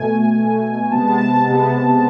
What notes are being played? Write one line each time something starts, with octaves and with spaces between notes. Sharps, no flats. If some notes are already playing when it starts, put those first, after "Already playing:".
Already playing: B2 A3 G#5
B2 A3
C3 G#3 B3 A5
A5
A5
C3 G#3 B3